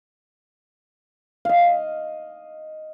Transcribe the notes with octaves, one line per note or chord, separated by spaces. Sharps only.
D#5 F5